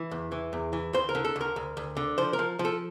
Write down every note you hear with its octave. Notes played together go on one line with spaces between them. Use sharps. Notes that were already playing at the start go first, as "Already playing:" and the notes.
Already playing: E3
E2
E3
E2
E3
D2 C5
A#4
D3
A4
D2 A#4
D2
D2
D3
F3 C5
A#4
F3
F3
A4